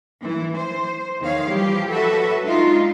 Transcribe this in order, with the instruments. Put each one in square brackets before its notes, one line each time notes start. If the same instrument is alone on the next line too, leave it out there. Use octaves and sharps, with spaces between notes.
[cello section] E3
C5
E2 D#3 G#4 C#5 F5
E3 F3 G3 G4
F#3 F#4 A4 B4 E5
G#3 D4 D#4 F4